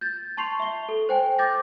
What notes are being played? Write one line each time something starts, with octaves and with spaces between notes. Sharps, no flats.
G6 A6
A5 C6 C#6 C7 F7
E5 G7
A4
C5 G5 G#5
D6 G6 A6 A#6